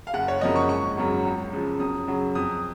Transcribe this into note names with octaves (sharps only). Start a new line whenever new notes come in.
F5
F#1 F#5
C#5
F#2 C#3 F3 A#3 D#5
C#6
G#1 C#6
F#2 C#3 F#3
C#2
C#3 F3
F#2 D#6
C#3 F#3
F2 D#6